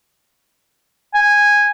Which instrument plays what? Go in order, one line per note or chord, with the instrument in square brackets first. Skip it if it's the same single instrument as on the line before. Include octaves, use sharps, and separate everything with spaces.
[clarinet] G#5